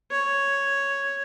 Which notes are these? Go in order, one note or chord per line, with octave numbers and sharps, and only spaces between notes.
C#5